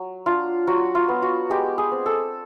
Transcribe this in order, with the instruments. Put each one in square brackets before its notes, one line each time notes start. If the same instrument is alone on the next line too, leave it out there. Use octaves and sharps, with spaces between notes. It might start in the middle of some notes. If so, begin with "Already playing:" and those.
Already playing: [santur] F#3
D4 F4
F#3 F#4
F4
B3
F#4
G#3 G4
G#4
C4
A4